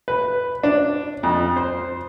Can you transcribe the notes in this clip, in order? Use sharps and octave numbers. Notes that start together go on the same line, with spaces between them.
B4
D4
F2
C5